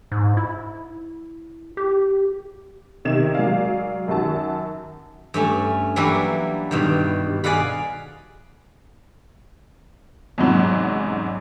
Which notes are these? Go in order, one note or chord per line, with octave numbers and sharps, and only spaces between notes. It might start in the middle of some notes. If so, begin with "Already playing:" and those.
G#2
E4
G4
C3 D#3 G4 D#5 G#6 E7
F#3 G#3 A#4 D5 F5
F#2 D#3 F#4 A5
G2 A3 C#4
E3 F#3 G3 A#3 D4 E4
G2 B2 D#3
G#4 D5 D#5 F5 F#5 B5
E2 G#2 C3 F#3 C#4